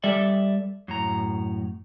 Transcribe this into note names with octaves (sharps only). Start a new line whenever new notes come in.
G3 A4 D5 E5
F#2 A2 A#5